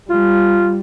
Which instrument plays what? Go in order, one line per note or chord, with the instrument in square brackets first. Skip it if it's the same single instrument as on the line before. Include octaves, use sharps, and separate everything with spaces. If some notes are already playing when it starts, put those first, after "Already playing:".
[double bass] G3 [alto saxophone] F4